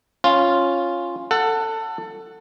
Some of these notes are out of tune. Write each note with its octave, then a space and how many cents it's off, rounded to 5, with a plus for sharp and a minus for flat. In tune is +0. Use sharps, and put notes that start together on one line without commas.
C#4 -10 F4 +0
A4 +20 F#5 +0